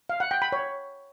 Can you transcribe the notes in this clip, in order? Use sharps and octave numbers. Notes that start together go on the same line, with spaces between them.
F5
F#5
G5
B5
C#5